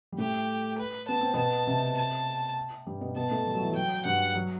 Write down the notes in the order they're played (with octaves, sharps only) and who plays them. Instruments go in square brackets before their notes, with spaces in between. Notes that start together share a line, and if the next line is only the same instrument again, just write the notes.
[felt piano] G3
[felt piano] A2 A3 [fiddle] G4
[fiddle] B4
[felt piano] B3 [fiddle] A5
[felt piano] C4
[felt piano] B2 B3 [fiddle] A5
[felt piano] C3 C4
[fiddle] A5
[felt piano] G2 G3
B2 B3
[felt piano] B2 B3 [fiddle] A5
[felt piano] A2 A3
G3
F#3
E3
F#3
[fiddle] G5
[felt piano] G2 G3 [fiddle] F#5
[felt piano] F#3